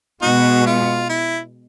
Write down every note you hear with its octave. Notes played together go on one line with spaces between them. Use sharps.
B2 G#3 B3 D#4 F#4
F4
E4